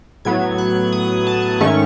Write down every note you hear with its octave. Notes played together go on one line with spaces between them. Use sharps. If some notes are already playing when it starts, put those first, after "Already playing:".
A2 F#3 B3 G#6
F#6
D#6
A5
G#2 D#3 A3 C#4 C#6